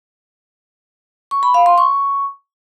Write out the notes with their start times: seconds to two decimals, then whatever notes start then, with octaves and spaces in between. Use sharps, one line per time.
1.31 C#6
1.43 B5
1.54 F5
1.66 C6
1.78 C#6